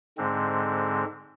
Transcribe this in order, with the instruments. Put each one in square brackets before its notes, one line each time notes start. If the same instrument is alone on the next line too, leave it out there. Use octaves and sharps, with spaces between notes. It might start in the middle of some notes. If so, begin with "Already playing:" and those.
[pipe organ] G#2 D3 G#3 C4